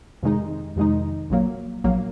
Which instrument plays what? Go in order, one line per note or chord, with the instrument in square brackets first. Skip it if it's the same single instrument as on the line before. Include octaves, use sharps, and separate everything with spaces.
[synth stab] F2 C3 D#3 G#3 D#4
F2 C3 D#3 G#3 D#4
A#1 A#2 F#3 A#3
A#1 A#2 F#3 A#3